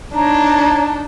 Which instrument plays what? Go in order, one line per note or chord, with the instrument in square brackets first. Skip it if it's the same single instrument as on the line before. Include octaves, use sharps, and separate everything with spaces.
[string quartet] D4 D#4 [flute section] C#5 A#5